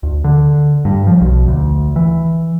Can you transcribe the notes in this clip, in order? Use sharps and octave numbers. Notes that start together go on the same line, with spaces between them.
D2
D3
G2
F3
B1
D2
E3